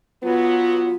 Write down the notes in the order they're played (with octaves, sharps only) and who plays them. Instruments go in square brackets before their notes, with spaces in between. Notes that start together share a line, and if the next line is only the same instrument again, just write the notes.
[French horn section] F#3 B3 [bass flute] F4